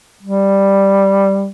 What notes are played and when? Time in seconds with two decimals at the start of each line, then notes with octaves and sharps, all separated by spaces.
0.23 G3